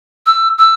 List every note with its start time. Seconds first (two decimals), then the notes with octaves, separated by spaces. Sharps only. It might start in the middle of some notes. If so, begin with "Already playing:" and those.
0.26 E6
0.58 E6